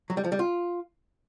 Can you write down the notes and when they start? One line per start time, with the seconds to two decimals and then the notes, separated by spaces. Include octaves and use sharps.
0.10 F#3
0.17 G3
0.24 F3
0.32 G3
0.39 F4